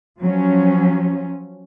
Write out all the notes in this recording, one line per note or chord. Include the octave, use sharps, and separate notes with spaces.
F3 F#3 C#4